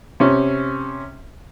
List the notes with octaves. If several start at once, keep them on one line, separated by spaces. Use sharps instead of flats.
C3 C#4